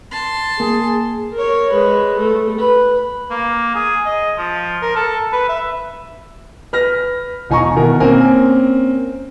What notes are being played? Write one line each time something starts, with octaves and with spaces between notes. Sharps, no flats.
A5 C6
A#3 G#4
A#4 C#5
G#3 B4
A3
B4
A#3
G#4
D#5
F3
A#4
A4
B4
E5
B4 F6 A#6
E1 D#4 G#5 A#5 C#6
B2 D#3 E4 A#4
A#3 C4 C#4 A#4 G#5